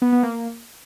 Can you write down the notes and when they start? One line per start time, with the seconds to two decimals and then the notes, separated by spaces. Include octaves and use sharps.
0.02 B3
0.12 B3
0.23 A#3